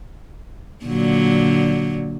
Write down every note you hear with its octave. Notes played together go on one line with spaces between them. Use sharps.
A#2 D3 F#3